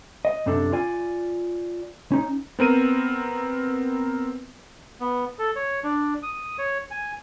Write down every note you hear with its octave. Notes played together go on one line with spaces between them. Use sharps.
D#5
C2 F#2 C3 D4 A4
F4 D5 G#5
C#4 D#4
B3 C4 A#4 D#7
B3
A4
C#5
D4
D#6
C#5
G#5